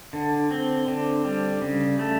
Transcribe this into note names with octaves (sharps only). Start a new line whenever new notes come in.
D3
C4
D3
G3
C#3
A3